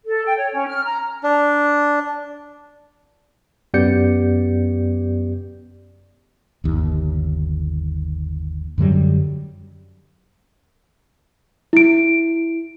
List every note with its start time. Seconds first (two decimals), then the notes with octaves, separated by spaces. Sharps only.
0.05 A4
0.25 G5
0.38 C#5
0.52 C#4
0.67 F6
0.85 A#5
1.23 D4
3.74 F#2 B3 G4 D5 G6 C#7
6.64 G1 D#2
8.78 F#2 D3 F#3 G3
11.73 E4 D7